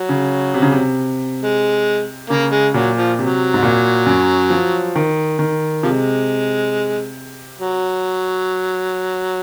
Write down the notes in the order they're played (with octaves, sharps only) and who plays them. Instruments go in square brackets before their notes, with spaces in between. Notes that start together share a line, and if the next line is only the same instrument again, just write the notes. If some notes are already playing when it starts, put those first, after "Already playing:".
Already playing: [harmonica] F#3
[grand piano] C#3
C3
C#3
C3
[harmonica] G#3
[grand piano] C#3 [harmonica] A#3
[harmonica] G#3
[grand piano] A#2 [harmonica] F#3
[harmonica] F3
[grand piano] C3 [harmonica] F#3
[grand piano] G#2
A#2
F#2
F3
D#3
D#3
[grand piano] C3 [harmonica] F3 G#3
[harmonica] F#3